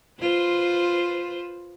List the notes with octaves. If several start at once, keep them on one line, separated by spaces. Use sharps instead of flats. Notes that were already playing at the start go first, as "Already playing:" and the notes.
F4 B4 C5